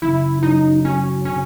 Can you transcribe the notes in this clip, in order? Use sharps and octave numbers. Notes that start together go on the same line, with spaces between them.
F#1 E4
F#2 D#4
F#3 C#4
C#3 C#4